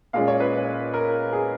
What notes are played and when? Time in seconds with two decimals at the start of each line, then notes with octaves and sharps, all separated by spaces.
0.13 A#2 G#3 C#4 F5
0.28 C#5
0.40 B4
0.94 A#4
1.33 G#4